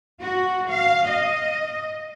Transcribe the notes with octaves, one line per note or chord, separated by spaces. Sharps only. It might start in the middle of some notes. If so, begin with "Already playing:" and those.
F#4
F5
D#5